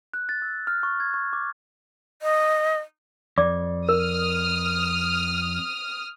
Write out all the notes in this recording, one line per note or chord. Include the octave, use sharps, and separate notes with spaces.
F#6
A6
E6
F6
C#6
G#6
C#6
D6
D#5
F2 D5 D6
A#4 D#6 F6